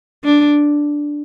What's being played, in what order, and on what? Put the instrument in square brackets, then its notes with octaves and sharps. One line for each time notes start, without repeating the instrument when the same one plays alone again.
[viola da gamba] D4